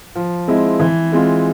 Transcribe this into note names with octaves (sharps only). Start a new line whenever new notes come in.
F3
G#3 C4 E4
E3
G#3 C4 F4